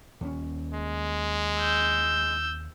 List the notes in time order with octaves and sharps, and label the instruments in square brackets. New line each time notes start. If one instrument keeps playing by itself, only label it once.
[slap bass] D#2 C#4
[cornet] G#3
[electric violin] E6 G6